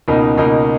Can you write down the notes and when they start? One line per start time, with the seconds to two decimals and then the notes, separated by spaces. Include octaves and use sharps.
0.08 C#2 B2 A#3 D#4 A#4
0.38 C#2 B2 A#3 D#4 A#4